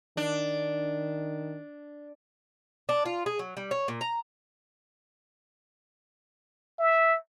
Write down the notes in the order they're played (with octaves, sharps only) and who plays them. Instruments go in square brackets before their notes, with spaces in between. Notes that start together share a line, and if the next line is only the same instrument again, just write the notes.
[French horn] D#3 [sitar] D4
[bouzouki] D4
F4
G#4
F#3
G3
C#5
A#2
A#5
[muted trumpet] E5